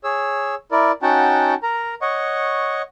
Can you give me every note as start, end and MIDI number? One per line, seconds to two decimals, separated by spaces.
0.04 0.55 68
0.04 0.55 73
0.04 0.55 88
0.71 0.92 64
0.71 0.92 70
0.71 0.92 74
1.02 1.54 61
1.02 1.54 63
1.02 1.54 66
1.02 1.54 78
1.02 1.54 79
1.02 1.54 81
1.63 1.94 70
1.63 1.94 82
2.02 2.82 73
2.02 2.82 75
2.02 2.82 78
2.02 2.82 85